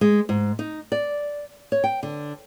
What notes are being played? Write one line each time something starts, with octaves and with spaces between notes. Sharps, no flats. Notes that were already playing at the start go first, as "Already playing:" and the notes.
G#3
G#2
D#4
D5
C#5
G5
D3